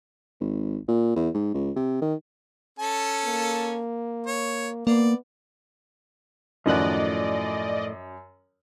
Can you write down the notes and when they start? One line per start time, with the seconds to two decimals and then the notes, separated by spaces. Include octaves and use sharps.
0.41 G#1
0.88 A#2
1.16 E2
1.34 G#2
1.54 C#2
1.76 C3
2.02 D#3
2.79 C#4 A4 A5
3.25 A#3
4.27 C#5
4.87 A#3 B3 D5
6.66 F#2 A2 D#3 F3 D5 D#5 F#5 F#7